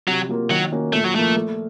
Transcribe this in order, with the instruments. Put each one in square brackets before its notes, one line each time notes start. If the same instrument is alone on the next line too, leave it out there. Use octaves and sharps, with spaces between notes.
[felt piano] C3 [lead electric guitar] F#3
[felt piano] F#3 A#3 F4 A#4
[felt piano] D#3 [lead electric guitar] F#3
[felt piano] A#3 C#4 F#4 A#4
[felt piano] A#2 [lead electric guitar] A3
[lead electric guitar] F#3
[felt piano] F3 A#3 [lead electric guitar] A3
[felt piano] A3